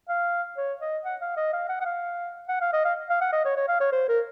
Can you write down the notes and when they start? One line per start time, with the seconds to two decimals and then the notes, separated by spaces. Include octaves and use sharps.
0.09 F5
0.57 C#5
0.82 D#5
1.05 F#5
1.21 F5
1.37 D#5
1.53 F5
1.69 F#5
1.81 F#5
1.85 F5
2.49 F#5
2.61 F5
2.73 D#5
2.85 F5
3.09 F5
3.21 F#5
3.33 D#5
3.45 C#5
3.57 C#5
3.69 F5
3.81 C#5
3.93 C5
4.09 A#4